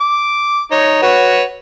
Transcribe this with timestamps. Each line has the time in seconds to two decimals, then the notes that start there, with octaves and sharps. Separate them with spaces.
0.01 D6
0.72 D#4 C#5
1.02 F#4 B4 C#5